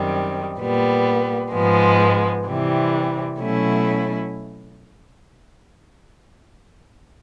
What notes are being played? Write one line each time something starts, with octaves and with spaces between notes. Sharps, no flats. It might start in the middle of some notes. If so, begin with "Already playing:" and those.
Already playing: F#2 D#3 G3 C4
A#2 G3 B3
G#2 F3 G#3 B3
C3 E3 G3 C4
B2 F#3 A3 C#4 E4